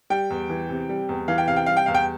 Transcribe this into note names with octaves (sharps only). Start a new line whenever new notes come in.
G3 G5
E2
E3
C3
G3
E2
E3 F5
G5
C3 F5
G5
G3 F5
G5
E2 F5
G5